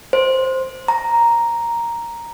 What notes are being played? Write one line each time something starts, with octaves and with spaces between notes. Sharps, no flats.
C5
A#5